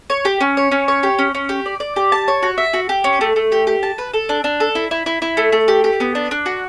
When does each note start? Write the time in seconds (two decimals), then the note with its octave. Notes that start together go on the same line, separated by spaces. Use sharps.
0.10 C#5
0.25 G4
0.41 C#4
0.57 C#5
0.72 C#4
0.88 C#5
1.03 G4
1.19 C#4
1.35 C#4
1.49 G4
1.66 D5
1.80 D5
1.96 G4
2.12 A5
2.28 C#5
2.43 F#4
2.58 E5
2.74 F#4
2.89 G4
3.04 C#4
3.21 A3
3.36 A3
3.52 G4
3.67 G4
3.83 A5
3.98 B4
4.14 A4
4.29 D4
4.44 D4
4.60 A4
4.75 E4
4.91 E4
5.06 E4
5.22 E4
5.37 A3
5.52 A3
5.68 G4
5.84 G4
6.00 B3
6.15 D4
6.31 D4
6.46 F#4